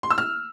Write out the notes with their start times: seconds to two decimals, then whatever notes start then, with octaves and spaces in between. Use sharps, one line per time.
0.03 C6
0.11 E6
0.18 F6